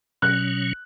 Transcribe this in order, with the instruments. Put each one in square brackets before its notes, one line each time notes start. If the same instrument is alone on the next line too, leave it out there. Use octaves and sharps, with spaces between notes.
[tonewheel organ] B2 F#3 C#4 [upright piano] F#6